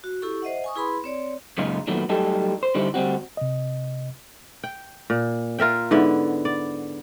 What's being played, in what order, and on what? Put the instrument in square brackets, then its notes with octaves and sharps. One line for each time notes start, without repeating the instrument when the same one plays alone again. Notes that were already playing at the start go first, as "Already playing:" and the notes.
[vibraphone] F#4
E4 G4 A4 C#6
C5 D#5 E5 F#5
G#5 C#6 D#6
E4 G#4 B4 B5 C6
C4 C#5 D5
[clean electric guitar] F#2 A#2 C#3 G#3 D#4 F4
A#2 D#3 F#3 A3 B3
F#3 G3 A3 D#4 G4 A4
C5
D3 G3 D#4 E4 C5
D2 G3 C4 F#4
[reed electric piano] C3 D#5
[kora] G5
A#2
F4 A#4 E5 G5
G#2 D3 B3 E4
D5